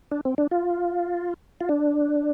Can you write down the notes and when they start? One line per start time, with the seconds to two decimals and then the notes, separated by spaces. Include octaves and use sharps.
0.12 D4
0.25 C4
0.38 D4
0.51 F4
1.61 F4
1.69 D4